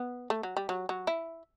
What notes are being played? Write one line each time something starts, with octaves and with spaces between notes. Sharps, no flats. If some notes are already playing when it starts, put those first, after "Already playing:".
Already playing: B3
A3
F#3
G3
F#3
F#3
E4